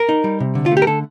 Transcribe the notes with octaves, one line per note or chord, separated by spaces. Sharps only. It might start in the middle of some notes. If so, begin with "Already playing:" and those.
Already playing: A#4
D#4
G3
C3
D3
F4
A3
G4
A#4
D3 A4